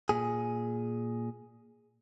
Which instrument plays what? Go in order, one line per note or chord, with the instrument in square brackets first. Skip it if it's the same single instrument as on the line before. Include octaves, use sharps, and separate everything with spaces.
[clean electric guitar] A#2 G#4